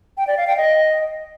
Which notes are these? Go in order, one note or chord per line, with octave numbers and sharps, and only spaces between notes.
G5
D5
F5
G5
D#5